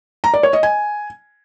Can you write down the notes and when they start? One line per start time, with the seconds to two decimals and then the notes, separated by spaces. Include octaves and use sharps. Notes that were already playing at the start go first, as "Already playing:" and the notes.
0.24 A#5
0.34 D5
0.43 C#5
0.53 D#5
0.63 G#5